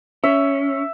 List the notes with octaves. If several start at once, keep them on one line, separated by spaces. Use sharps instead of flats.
C#4 E5